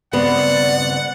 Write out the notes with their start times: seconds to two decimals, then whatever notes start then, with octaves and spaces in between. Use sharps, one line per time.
0.13 G2 C#3 B3 C4 D5 F#5